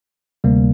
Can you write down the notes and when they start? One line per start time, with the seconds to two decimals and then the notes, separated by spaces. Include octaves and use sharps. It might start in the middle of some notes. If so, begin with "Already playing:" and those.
0.44 D2 C3 G3 A#3